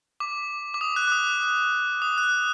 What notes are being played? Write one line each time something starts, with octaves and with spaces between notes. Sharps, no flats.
D6
D6
D#6
F#6
D6
D#6
D#6
F#6